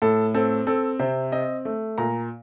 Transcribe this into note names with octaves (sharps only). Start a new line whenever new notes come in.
A2 A4
C4 A4
C4 A4
C3 C5
C4 D#5
A3
A#2 A#5